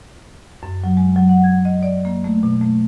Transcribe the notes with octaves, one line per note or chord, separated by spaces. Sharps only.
F#2
F#3
G#3
F#3
F#5
G#6
D#5
D5
A#3
A3
B2
A3